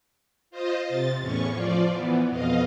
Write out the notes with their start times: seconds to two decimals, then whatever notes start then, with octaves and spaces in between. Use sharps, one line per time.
0.51 F4 C5 D#5
0.86 C3 A6
1.19 E2 A2 C#4 C#6
1.52 F3 F4 D5
1.87 E3 B3
2.28 F2 B2 D#5 F5